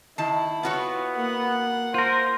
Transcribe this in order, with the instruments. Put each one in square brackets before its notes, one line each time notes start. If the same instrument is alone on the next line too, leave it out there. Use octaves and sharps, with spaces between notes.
[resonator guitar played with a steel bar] D#3 A5 [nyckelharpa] E4
[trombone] B3 [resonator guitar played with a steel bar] F4 F#4 C#5
[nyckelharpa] A#3 F#5
[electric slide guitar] F4 A#4 [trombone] C5